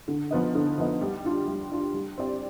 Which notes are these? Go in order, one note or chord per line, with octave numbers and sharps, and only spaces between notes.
D3
F3 B3 D#4
D3
F3 B3 D#4
G3
D4 F4
G3
D4 F4
G3
C4 G4 D5